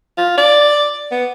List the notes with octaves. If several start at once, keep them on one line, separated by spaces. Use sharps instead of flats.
F4
D5
B3